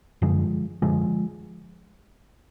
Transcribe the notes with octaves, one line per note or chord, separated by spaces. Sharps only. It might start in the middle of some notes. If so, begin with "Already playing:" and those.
F#2 D3 F3 G#3
F#2 D3 F3 G#3